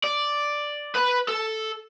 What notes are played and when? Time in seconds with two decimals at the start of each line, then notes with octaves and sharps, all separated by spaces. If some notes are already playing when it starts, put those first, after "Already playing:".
0.04 D5
0.95 B4 B5
1.28 A4